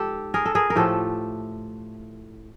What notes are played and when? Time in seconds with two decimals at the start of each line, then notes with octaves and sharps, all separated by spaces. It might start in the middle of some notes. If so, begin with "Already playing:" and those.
Already playing: G#2 G4 A4
0.34 G#4 A#4
0.46 A4
0.55 G#4 A#4
0.70 A#4
0.76 A2 F3 A3 G4 A4